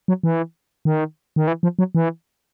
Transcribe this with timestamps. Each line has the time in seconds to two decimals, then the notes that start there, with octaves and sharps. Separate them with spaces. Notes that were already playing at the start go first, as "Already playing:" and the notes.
0.08 F#3
0.23 E3
0.85 D#3
1.36 D#3
1.47 E3
1.63 F3
1.79 F#3
1.95 E3